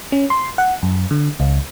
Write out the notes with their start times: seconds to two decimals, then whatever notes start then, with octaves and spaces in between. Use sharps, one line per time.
0.12 C#4
0.30 C6
0.58 F#5
0.83 F#2
1.11 D3
1.40 C#2